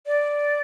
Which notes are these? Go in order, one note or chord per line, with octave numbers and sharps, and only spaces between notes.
D5